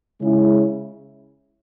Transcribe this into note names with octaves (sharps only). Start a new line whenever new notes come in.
C#3 G#3 C#4 E4